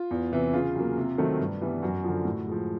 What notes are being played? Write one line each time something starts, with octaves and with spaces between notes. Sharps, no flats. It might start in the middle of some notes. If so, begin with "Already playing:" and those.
Already playing: F4
E2
C3 E3
C#3 F4
F#3 A#3
C3
D#3 F#3 A3 C4
G2
E3 G3 B3
F#2 F#4
D3 F3
A2
F3 G#3